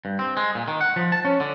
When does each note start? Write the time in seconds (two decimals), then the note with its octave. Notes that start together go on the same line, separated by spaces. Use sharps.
0.05 G2
0.19 C4
0.37 G#3
0.55 A#2
0.68 D#3
0.81 F#5
0.96 F3
1.12 A5
1.25 C#4
1.40 D3